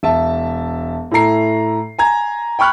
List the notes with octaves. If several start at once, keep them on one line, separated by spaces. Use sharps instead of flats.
E1 E5 A5
A2 E4 A4 A#5 C7
G#5 A#5 G#6
G5 B5 C#6 F6 F#6